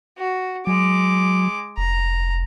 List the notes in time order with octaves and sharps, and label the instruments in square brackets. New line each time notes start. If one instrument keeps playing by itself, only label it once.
[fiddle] F#4
[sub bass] F#3 [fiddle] G#3 D6
[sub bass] F1 [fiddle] A#5